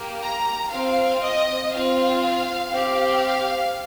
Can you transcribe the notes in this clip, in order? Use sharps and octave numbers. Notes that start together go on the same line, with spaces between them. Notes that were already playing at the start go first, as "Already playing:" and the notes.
Already playing: A#3 G4
A#5
C4 F4 F5
D#5
C4 F4 F5
C4 G4
F5